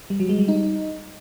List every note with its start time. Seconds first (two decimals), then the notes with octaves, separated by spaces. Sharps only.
0.10 G3
0.20 F#3
0.29 G#3
0.39 G3
0.48 D#4